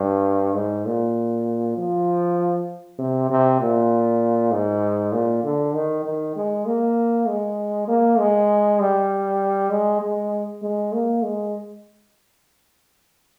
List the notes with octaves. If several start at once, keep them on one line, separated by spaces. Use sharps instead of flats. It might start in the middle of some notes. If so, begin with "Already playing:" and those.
Already playing: G2
G#2
A#2
F3
C3
C3
A#2
G#2
A#2
D3
D#3
D#3
G#3
A#3
G#3
A#3
G#3
G3
G#3
G#3
G#3
A#3
G#3